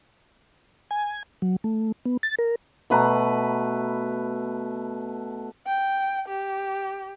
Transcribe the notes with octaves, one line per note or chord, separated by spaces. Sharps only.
G#5
F#3
A3
B3
A6
A#4
B2 A3 B4 A#5
G5
G4